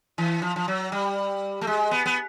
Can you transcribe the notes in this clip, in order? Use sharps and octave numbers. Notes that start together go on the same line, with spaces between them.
E3
F3
F3
F#3
G3
A3
G#3
B3
B3